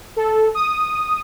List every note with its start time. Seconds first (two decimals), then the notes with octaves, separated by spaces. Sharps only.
0.16 A4
0.55 D#6